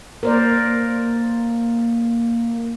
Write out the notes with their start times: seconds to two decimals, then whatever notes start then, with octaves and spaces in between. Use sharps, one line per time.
0.23 A#3 A#4 C5 D5